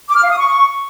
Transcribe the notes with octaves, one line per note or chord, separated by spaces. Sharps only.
D6
F6
F5
D#6
C#6